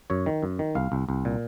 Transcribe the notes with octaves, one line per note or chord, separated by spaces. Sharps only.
F#2 C#5
D#3
F#2
D#3
C2 F5
C2
C2
A#2